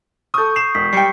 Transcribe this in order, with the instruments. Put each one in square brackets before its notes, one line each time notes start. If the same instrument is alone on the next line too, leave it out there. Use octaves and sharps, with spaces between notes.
[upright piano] A4 D#6 [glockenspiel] C#6 G6
[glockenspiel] C7 [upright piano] E7
[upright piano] E1 [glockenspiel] B6
[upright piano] G3 G5 [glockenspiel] C7 C#7